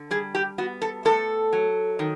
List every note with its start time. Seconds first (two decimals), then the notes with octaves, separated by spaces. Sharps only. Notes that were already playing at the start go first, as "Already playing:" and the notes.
Already playing: D3
0.11 G3 G#4
0.35 G4
0.58 B3 F#4
0.82 A4
1.05 A2 A4
1.53 F#3
1.99 D#3